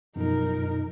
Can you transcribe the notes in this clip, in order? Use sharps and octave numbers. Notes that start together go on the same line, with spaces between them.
F#2 B2 F3 D#4 A#4